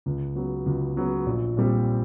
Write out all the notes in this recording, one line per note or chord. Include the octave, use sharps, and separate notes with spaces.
C#2
C#3 F#3 B3
C#2
C#3 F#3 B3
A#1
A#2 G3 C4